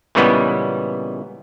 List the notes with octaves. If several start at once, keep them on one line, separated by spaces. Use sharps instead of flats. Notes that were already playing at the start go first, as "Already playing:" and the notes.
A#2 C#3 E3 G3 G#3 B3